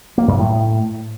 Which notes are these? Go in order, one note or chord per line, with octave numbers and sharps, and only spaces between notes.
A#3
F#2
A2